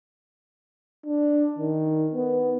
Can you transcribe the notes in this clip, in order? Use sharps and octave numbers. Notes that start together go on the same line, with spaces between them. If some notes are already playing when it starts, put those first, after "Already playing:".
D4
D#3
B3